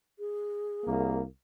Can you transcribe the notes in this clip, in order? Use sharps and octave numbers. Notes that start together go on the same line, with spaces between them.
G#4
C2 A#3